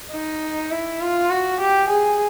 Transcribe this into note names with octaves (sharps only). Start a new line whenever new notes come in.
D#4
E4
F4
F#4
G4
G#4